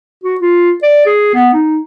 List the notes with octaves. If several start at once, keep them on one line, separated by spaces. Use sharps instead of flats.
F#4
F4
D5
G#4
B3
D#4